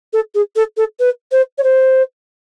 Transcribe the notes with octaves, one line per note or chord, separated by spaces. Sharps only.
A4
G#4
A4
A4
B4
C5
C#5
C5